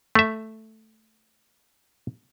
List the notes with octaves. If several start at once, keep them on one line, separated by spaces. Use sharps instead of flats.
A3 E5